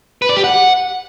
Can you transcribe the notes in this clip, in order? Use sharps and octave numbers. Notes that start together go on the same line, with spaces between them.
B4
D5
G4
F#5